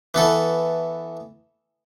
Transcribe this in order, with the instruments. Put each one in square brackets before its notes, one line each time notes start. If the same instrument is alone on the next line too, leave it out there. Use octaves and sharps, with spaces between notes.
[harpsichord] E3 B3 A4